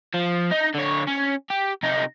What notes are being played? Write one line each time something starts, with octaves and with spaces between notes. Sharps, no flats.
F3
D#4
D3 C#5
C#4
G4
C3 D#4